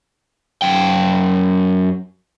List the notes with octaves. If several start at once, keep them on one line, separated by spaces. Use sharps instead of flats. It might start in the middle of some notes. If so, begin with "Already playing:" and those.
F#2 G5